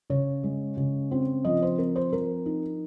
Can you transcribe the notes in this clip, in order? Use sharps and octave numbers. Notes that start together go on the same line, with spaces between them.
C#3 C#5
G#3
C#3
C4
F3 D#5
C5
C4 A#4
C5
F3 A#4
D#4